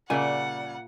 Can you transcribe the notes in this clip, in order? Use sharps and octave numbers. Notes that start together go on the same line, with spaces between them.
A#2 C#3 G3 A#3 D5 E5 F#5 G#5